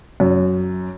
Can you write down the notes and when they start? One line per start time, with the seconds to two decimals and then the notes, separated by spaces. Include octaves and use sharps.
0.20 F#2